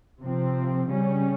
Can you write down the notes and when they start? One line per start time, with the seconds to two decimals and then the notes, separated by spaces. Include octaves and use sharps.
0.20 C3 F3 C4
0.87 C#3 G3 C#4